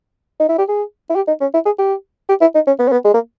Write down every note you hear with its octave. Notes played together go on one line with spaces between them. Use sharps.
D#4
E4
G4
G#4
E4
G4
D#4
C#4
E4
G#4
G4
G4
E4
D#4
C#4
B3
C#4
B3
G#3
A#3